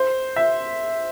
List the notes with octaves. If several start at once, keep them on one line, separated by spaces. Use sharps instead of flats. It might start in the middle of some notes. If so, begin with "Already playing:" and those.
Already playing: C5
E5